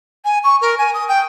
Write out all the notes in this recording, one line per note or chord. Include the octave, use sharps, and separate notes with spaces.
G#5
C#6
A#4
G#5
D#6
G5